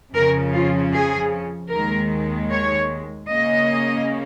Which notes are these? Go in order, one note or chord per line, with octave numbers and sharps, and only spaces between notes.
F2 C#3 F3 C#4 A#4
F4
G#4
D#2 D#3 G#3 A#4
C#5
C#3 A#3 C#4 D#5